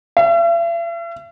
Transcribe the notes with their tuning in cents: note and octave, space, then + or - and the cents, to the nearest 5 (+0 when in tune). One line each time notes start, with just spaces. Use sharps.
E5 +45